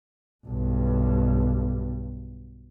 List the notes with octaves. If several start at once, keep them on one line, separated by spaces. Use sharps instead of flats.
B1 G2